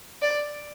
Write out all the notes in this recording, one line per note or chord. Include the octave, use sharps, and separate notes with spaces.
D5